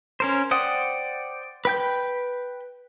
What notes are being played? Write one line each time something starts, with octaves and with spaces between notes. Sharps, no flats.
C#4 A#4 C5
C5 D5 F#5 G5 D#6
B4 G5 G6